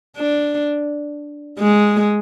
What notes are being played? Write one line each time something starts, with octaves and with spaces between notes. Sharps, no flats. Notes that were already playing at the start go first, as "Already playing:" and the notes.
D4
G#3